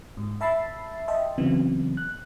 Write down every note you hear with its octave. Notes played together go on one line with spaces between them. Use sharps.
G#2
E5 A5 B5 E6 A6 C7
D#5 E5 G5 A5 C6
C#3 E3 F#3 B3 C4
F#6